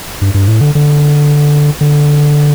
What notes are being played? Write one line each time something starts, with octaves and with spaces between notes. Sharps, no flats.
G2
G2
A2
D3
D3
D3